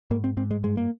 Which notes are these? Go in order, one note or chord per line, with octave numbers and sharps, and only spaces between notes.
G#2 A#3
C4
G#2 C4
G#3
G2 G#3
A#3